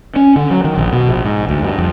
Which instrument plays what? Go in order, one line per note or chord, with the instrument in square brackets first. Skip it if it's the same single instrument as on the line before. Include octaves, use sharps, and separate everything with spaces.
[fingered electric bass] C#4
D3
F#3
D#3
A#1
B2
A#1
G#2
D2
G2
F2